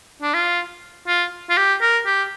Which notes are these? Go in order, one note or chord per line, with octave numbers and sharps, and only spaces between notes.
D4
F4
F4
F4
G4
A#4
G4